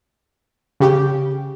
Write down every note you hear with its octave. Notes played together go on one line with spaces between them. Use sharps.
C#3 G4